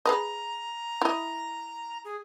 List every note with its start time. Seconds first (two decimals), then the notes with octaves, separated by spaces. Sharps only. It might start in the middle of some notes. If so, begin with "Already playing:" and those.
0.05 G#4 B4 D#5 A#5
1.01 E4 D#5
2.05 G#4